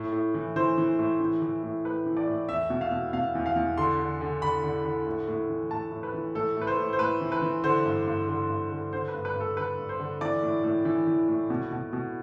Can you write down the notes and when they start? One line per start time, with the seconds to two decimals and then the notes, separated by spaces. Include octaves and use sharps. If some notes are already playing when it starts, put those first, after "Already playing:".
Already playing: A2
0.12 A2
0.34 E3
0.56 E3 C5
0.78 E3
0.99 A2
1.20 E3
1.42 E3
1.63 A2
1.85 A2 B4
2.06 E3
2.17 D5
2.27 A2
2.49 E2 E5
2.70 B2
2.81 F5
2.92 B2
3.13 B2 F5
3.35 E2
3.46 F5
3.56 E2
3.77 D3 C6
4.00 D3
4.21 D3
4.42 D3 B5
4.63 D3
4.85 D3
5.06 A2
5.28 A2
5.50 E3
5.70 A2 A5
5.92 A2
6.03 B4
6.14 E3
6.35 A2 A4
6.56 A2
6.61 B4
6.67 C5
6.78 A2
6.93 C5
6.99 A2 B4
7.21 E3
7.32 B4
7.42 E3
7.64 D3 C5
7.85 G2
8.07 G2
8.28 D3
8.50 G2
8.71 D3
8.93 D3 C5
9.08 B4
9.14 G2
9.25 B4
9.35 G2 A4
9.57 D3 B4
9.79 G2
9.89 C5
10.00 D3
10.21 E3 D5
10.42 A2
10.64 A2
10.85 E3
11.07 E3
11.28 A2
11.50 B2
11.72 B2
11.93 B2